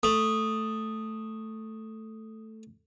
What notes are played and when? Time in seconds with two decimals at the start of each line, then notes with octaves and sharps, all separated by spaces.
0.03 A3 D#6